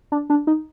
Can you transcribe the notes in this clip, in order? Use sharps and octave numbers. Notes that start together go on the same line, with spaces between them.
D4
D4
D#4